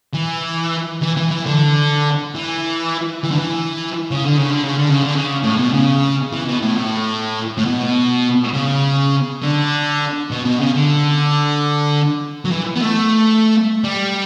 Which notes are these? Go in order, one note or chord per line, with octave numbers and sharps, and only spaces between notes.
E3
E3
E3
E3
D3
E3
E3
D3
E3
C#3
D3
C#3
D3
C#3
D3
C#3
D3
C#3
A2
B2
C#3
E3
B2
A2
A2
A2
B2
C#3
D3
B2
B2
C#3
D3
F#3
E3
B3
A3
G3